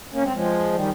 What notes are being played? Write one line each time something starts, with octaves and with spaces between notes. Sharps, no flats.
A#3 C#4
G#3 C4
F3 G#3
D#3 G3